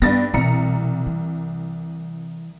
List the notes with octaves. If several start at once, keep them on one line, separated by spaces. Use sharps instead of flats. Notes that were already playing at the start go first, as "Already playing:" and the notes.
G2 B3 A6 A#6
C2 B2 E3 A#5 C#7
E3